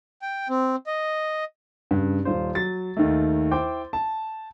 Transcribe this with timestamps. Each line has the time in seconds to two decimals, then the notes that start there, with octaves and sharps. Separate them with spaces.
0.22 G5
0.49 C4
0.87 D#5
1.91 G2 C#3
2.25 D#1 F4 C5
2.55 F#3 A6
2.97 D#2 D#3 A3
3.51 E4 C5 G5 D6
3.93 A5